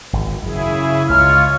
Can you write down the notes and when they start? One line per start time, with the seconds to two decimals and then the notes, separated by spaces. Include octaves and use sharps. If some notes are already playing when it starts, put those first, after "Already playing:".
0.13 G#1
0.43 F#2 C#3 E4 G#4
1.09 C#2 F4 C#5 F6